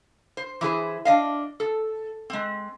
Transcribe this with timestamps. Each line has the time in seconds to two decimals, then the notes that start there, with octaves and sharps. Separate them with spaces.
0.37 C5
0.61 E3 E4 G#4 C5
1.05 D4 D#5 F5
1.60 A4
2.30 G#3 C4